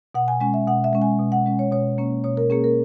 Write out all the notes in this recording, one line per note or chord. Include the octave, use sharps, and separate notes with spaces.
B2 F#5
G#5
G#3 C#4 G#5
E5
B2 F#5
E5
G#3 C#4
G#5
B2
F#5
G#3 C#4
C#5
B2 C#5
A#3 C#4
B2 C#5
A#4
A#3 C#4 G#4
A#4